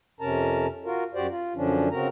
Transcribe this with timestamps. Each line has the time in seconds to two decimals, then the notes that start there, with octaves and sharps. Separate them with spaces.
0.20 F2 C3 C#4 A#4 A5 A#5
0.85 F4 F#4 A#4
1.14 F#2 F#4 G4 C5 D5
1.30 F4
1.56 F#2 D3 F3 C#4 D4
1.92 C#3 C4 F#4 A#4 A#5